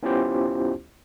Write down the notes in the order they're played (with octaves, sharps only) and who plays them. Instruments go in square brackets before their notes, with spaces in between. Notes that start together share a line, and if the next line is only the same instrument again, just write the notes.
[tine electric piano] B3 C#4 E4 F4 G4 C5